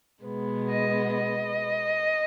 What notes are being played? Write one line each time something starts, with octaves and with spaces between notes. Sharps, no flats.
B2 G#3 B3
D#5
D#5